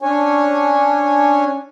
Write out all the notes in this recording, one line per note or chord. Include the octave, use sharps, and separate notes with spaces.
C#4 D4 C#5 G#5